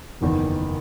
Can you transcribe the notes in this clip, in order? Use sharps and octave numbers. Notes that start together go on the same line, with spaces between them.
F#1 E2 D#3